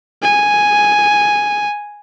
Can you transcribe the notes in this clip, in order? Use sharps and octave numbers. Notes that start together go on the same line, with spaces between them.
G#5